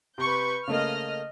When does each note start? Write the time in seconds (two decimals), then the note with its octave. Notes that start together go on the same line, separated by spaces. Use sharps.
0.18 C3 B4 C#6 G6
0.67 C#3 A3 A#3 D#5 F6